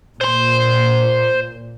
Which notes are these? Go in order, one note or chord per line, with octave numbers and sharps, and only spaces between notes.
A#2 C5 C6